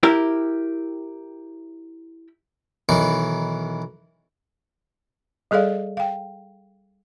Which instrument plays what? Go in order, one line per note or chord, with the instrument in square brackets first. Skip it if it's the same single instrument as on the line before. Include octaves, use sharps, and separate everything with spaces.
[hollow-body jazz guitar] E4 G4 A#4
[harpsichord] B1 D#3 E3
[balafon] G3 G#4 A4 D5 F5
F5 G5